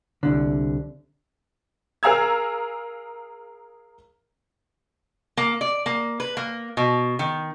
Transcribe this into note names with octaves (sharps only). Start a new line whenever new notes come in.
C2 D3
G#4 A#4 F5 A#5 E6 G#6
A#3
D5
A#3
B4
A#3
B2
D#3